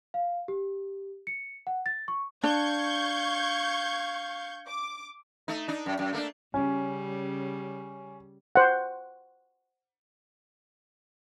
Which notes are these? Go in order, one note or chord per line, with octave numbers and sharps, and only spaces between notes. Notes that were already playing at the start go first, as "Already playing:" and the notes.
F5
G4
C#7
F#5
A6
C#6
D4 F5 C#6 G6 G#6
D6
A3 D#4
D4 D#4
F#2
F#2
A3 A#3 D4
C#3 G3 C#4
C5 F#5